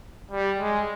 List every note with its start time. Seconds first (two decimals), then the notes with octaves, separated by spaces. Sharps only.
0.31 G3
0.60 G#3